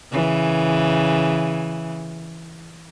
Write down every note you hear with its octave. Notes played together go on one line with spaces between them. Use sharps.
C#3 E3